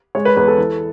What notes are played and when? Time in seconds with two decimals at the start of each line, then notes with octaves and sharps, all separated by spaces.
0.15 G#3 C#5
0.25 B4
0.36 E2 B4
0.48 A4
0.58 E3